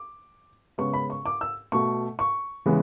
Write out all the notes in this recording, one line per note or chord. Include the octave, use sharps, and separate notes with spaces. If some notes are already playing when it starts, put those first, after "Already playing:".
Already playing: D6
C#3 G#3 B3 C#6
B5
C#6
D6
E6
B2 A3 C#6
C#6
C#3 E3 G#3 B3